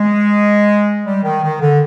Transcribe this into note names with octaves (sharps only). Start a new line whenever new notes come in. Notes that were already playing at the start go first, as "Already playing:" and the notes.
Already playing: G#3
G3
D#3
D#3
D3